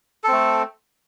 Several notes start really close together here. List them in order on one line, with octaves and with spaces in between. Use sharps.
A4 C4 A3